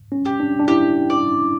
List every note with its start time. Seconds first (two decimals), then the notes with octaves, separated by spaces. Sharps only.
0.12 C#4
0.25 G4
0.40 D4
0.59 D4
0.68 E4 G4
1.10 D5